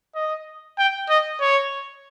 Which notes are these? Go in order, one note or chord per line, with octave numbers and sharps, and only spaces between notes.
D#5
G5
D#5
C#5